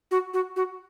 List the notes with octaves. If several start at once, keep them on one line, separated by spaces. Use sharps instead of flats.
F#4
F#4
F#4